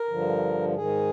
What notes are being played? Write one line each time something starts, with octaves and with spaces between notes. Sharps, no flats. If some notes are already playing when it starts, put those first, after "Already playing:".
Already playing: A#4
G2 D3 F3
G#2 D#3 G#4